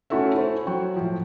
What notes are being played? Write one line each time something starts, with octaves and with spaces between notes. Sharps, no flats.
A3 C#4 E4 F#4 A4 E5
E4 A4 C5
F#3 F#4 G5
A2 F3